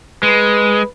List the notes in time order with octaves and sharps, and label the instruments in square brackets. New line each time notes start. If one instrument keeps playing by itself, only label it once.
[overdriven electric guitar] G#3 [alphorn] B4